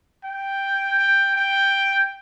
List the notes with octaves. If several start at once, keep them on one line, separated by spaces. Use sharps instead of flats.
G5
G5
G5